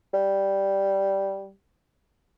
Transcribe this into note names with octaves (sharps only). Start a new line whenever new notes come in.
G3